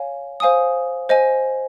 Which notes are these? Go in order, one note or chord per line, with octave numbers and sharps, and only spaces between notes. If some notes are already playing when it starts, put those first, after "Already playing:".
Already playing: C#5 F5 G#5
C5 F5 G#5 D#6
C5 D#5 G#5